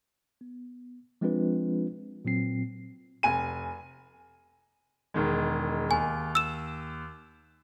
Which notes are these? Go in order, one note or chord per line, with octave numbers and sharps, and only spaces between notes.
B3
F3 G#3 C4 D4 F4 B4
A#2 F#3 C4 C7
F1 G#5 D#7
E1 D#3 G#3
D#2 G#5
E6 E7